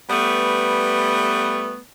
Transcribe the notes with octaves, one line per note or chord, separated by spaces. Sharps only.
G3 A3 B3